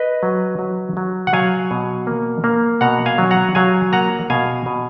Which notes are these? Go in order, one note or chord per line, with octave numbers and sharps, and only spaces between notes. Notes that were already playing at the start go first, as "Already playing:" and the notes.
Already playing: B4 D#5
F#3
F#3
F#3
F#5
F#3 F5 G#5
B2
A#3
A#3
B2 F#5 A#5
F5 G#5
F#3
F#5 A#5
F#3 F5 G#5
A#3 F#5 A#5
B2 F5 G#5
B2